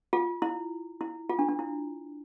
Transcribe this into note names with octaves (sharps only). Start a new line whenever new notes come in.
F4
E4
E4
F4
D4
D4
E4